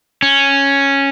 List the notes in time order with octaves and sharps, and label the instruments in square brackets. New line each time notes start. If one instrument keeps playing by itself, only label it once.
[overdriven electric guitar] C#4